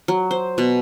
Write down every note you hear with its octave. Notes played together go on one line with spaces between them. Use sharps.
F#3
C5
B2